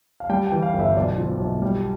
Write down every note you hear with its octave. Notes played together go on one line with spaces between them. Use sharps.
F5
G3 G5
E3 G5
F5
G1
E5
B1 D5
F3
B1
G3